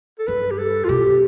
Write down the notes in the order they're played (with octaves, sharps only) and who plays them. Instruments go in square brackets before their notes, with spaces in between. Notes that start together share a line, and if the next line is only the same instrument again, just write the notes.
[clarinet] A4
[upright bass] G2 [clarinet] B4
[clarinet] G4
A4
F4
[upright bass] B2 [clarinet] G4